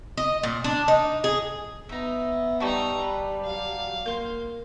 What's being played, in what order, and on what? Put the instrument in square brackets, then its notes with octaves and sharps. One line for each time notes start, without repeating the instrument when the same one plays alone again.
[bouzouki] D#5
A#2
D4
D#4
G#4
[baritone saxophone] B3 [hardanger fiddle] D#4 [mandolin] E5 A#5
[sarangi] G3 [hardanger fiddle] D#4 A#5 [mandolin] A5 C#6 E6
[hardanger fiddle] B4
[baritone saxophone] F#3 [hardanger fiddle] F5
[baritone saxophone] A#3 [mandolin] C6 G6